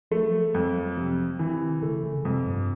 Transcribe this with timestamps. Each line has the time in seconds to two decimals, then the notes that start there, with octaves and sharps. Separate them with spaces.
0.11 F3 A3
0.21 F#3
0.30 F3
0.54 F2 F#3
0.97 C3 F3
1.39 D#3 E3
1.82 C#3 A3
2.03 C#3
2.17 C#3
2.24 F2 C3
2.46 G2